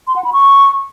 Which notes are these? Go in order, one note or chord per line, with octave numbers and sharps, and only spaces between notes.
C6
F#5
B5
C#6